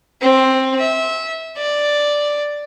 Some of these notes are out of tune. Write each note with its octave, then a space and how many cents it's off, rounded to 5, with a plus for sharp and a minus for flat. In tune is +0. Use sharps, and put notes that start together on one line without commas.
C4 +10
E5 -20
D5 +0